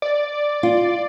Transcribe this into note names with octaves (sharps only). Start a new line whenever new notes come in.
D5
F4